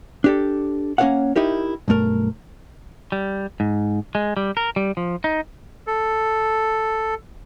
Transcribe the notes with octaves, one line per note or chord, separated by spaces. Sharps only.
D4 G4 A4
A#3 C#4 A4 C#5 F5 F#5
D#4 E4 G4 A#4
B1 G2 A3 A#4
G3
G#2
G#3
G3
A#4
G3
F3
D#4
A4